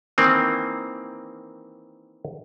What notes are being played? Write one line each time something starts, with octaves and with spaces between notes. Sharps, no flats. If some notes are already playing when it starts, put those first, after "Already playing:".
D#3 E3 A#3 C4